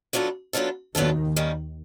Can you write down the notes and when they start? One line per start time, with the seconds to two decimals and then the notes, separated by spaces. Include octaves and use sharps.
0.13 F#3 B3 D4 F4 A4
0.53 F#3 B3 D4 F4 A4
0.95 D#2 D#3 F#3 B3 D4 F4 A4
1.36 D#3 G3 A#3 C#4